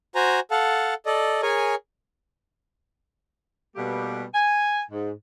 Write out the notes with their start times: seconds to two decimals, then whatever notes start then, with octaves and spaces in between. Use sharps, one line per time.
0.15 F#4 C5 G#5 A#5
0.51 A4 F5 F#5 A5
1.06 A4 D5 D#5
1.42 G#4 A#4 C#5 G#5
3.76 B2 G3 A3 A#3 G4 B4
4.34 G#5
4.91 G#2